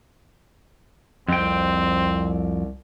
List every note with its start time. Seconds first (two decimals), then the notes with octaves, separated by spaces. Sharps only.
1.28 C2 F2 C4 G5